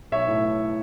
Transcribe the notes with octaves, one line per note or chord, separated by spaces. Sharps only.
B1 C#5 E5
A2